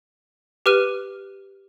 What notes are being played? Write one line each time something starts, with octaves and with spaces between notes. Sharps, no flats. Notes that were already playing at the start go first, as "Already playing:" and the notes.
G4 B4 F6 D#7